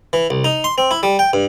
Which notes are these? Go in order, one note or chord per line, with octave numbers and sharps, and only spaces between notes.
E3
C2
D#4
C6
C4
E4
G3
G5
G2